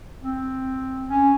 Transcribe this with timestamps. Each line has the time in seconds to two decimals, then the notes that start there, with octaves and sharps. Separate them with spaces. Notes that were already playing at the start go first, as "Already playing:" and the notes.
0.22 C4
1.09 C#4